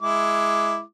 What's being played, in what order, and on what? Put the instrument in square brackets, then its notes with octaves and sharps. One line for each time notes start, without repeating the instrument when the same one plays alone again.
[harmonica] G#3 E4 D6